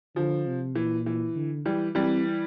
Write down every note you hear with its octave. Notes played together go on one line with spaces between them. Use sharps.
D3 F3
C3
A#2 E3
E3
D3
E3 G3
E3 G3 C4